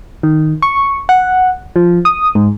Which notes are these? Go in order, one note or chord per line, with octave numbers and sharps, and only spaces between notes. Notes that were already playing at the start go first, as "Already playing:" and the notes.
D#3
C#6
F#5
F3
D#6
G#2